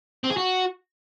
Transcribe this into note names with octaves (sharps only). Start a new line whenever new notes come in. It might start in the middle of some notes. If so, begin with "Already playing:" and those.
C4
G#4
F#4